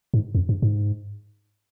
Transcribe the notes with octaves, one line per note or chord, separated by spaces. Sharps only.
G#2
F2
G2
G#2